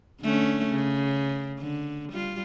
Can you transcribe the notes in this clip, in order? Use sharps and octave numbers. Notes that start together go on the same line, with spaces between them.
D3 A3 C#4
C#3
D3
G3 F4